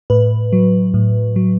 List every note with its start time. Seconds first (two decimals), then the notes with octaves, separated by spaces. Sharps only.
0.10 A2 B4
0.53 F#3
0.94 A2
1.36 F#3